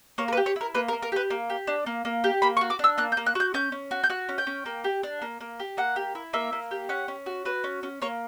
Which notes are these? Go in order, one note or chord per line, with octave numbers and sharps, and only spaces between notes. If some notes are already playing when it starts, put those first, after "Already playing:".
A#3 C#5
A#4
B4
G4
C#5
E4 A#4
A#3 B4
A#4
A#3
A#4
G4 B4
A#3
G4
D4
A#3
A#3
G4
A#3 B5
C#6
F#4
D6
D4 E6
A#3 F#6
G6
A#3
F#6
F#4 G6
C#4 G6
C#4
F#4
G6
F#4 F#6
C#4
G5
C#4
A#3
G4
D4
A#3
A#3
G4
A#3 F#5
G4
E4
A#3 E5
A#3
G4
C#4 F#5
C#4
F#4
F#4 B4
C#4
C#4
A#3 C#5